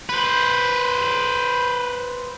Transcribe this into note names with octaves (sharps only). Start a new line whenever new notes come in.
B4 C5